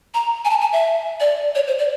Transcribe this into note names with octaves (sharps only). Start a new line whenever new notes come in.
A#5
G#5
A5
G#5
E5
D5
C#5
C5
D5